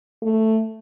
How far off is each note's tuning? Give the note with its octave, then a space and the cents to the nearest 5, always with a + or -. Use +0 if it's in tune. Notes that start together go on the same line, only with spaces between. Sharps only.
A3 +5